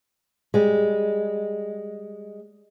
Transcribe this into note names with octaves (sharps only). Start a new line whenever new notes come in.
G3 G#3